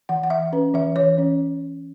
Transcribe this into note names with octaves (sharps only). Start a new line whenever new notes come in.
E3 F#5
F#5
E3 E5
C#4 B4
E3 E5
E3 C#5
C#4